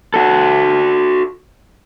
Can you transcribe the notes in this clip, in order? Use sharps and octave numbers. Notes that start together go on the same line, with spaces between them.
F#4 A4